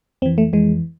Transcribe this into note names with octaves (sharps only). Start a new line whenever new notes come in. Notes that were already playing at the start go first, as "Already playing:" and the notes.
F2 E3 C4
A3
F2 E3 G#3